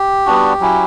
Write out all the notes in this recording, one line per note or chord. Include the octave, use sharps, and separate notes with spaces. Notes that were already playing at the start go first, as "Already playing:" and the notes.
Already playing: G4
G3 B3 D4 F#4
F#3 C#4 E4